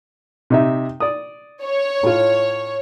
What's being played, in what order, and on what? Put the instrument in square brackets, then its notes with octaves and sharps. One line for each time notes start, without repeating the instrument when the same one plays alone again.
[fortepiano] C3 D#4 E5
D5 D#6
[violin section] C#5
[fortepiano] A2 F4